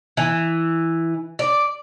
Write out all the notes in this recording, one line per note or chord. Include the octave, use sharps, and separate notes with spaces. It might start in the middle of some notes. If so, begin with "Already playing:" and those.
E3
D5